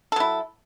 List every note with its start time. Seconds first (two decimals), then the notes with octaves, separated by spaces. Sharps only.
0.12 A4
0.16 F#3
0.20 E4